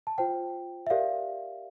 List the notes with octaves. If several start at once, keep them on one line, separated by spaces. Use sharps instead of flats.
A5
F4 C5 G5
E5
G4 A#4 D5 F5